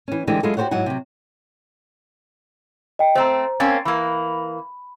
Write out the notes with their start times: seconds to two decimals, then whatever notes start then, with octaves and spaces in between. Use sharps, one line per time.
0.08 E3 C#4
0.27 D3 E3 G#3 D4 G4 C5
0.43 F#3 G#3 E4 F4 G#4 A4
0.57 F#4 G4 A#4 C5 C#5 F#5
0.71 G#2 F#3 E4 F#5 G#5
0.86 C3 F#3
2.99 D#5 G5
3.15 A3 C4 C5 A#5
3.60 A#3 C4 C#4 A6
3.85 E3 A#3 B5